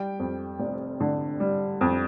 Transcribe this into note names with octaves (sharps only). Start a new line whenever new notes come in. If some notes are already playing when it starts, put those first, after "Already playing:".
Already playing: G3 G5
F2
F1
D3
G3
F2